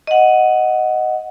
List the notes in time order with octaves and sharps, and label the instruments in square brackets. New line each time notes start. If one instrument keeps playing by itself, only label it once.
[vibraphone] D#5 F#5